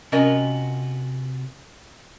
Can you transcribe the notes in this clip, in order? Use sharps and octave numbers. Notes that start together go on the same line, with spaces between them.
C3 C#4 F4 F#4 A#4 D#5